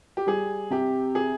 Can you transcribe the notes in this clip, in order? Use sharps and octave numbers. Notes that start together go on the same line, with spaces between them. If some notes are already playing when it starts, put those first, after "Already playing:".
G4
G3 G#4
C3 G4
G#4